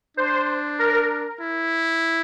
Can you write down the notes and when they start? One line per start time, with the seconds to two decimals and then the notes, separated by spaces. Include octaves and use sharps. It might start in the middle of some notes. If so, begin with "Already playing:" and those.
0.17 D4 C5
0.79 A#4
1.41 E4